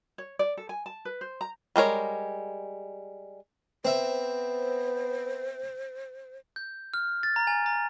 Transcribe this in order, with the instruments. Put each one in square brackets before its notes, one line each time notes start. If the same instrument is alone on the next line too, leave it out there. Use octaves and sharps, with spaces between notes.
[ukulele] C#5
D5
A4
G#5
A5
B4
C5
A#5
[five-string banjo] G3 G#3 A#4 C#5
[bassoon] B3 [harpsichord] C4 E5 [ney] C5
[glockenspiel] G6
F6
A6
A#5
G#5
A#5